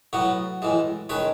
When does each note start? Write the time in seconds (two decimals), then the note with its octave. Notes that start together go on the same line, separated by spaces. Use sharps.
0.13 A2 F#3 B3 F#4
0.62 A2 E3 G#3
1.09 D#3 G#3 C#4 B4